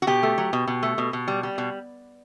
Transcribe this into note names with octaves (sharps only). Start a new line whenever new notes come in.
F#4
B2 G4
A3
F#3
B2
B2
A3
B2
B2
G3
G3
B2